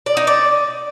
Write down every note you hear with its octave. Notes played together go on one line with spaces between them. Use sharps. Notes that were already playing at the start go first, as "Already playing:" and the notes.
D5
D#4
D5